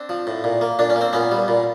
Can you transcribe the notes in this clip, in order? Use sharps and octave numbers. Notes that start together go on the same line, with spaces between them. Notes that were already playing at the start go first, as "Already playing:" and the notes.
Already playing: C4 D4
F3
A2
A#2
A#3
A#2 D4
C#4
A#3
C4
A#2 B3 C#4
G3
A#2